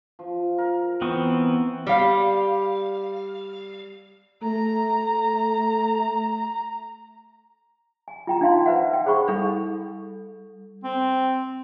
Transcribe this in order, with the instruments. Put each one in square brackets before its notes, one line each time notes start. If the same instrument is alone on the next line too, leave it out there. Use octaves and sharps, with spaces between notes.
[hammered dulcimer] F3
A#4
[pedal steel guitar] E3 B3 C4 [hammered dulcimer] C#6
[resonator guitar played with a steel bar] G3 F5
[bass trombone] A3 [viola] A#5
[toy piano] G#5
F4 G5 A#5
D4 D#4 F4 F5 G5 C6
B4 C5 E5 F#5
G5
G#4 C5 F#5 B5 C#6
[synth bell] G3 A4
[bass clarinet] C4